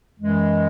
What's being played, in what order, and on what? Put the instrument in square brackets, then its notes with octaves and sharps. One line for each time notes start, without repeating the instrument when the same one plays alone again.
[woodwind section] F#2 E3 G#3